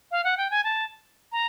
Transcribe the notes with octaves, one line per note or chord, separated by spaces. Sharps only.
F5
F#5
G5
G#5
A5
A#5